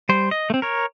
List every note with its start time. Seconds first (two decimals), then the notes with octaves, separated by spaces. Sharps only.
0.09 G3 C5
0.31 D#5
0.50 A3 C4
0.62 A#4 C#5